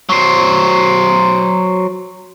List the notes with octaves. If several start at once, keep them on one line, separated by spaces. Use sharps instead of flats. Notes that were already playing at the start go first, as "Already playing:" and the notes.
F#3 C5